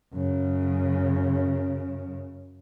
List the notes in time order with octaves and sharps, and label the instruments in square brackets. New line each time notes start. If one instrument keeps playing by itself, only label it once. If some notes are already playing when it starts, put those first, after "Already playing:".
[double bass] F#2 C#3